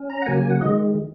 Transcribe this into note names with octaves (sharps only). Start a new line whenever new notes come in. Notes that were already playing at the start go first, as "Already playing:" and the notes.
Already playing: C#4
A#5
F#5
C#3 F#3 A#3 G#5
G#5
F#5
D#3 G#3 D#5